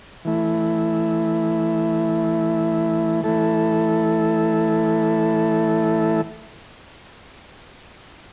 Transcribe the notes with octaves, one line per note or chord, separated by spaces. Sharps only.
E3 A3 E4
E3 A3 E4 A4